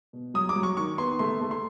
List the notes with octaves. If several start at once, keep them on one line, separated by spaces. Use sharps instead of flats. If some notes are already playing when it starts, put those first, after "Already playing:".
B2
F#3 D#6
D6
F#3
C#6
D#3 C#6
B3 C6
A3 C6
A3
C6